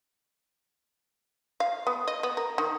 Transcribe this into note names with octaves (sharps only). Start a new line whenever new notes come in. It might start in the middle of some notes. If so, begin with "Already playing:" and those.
F5
B3
D#5
B3
A#4
D#3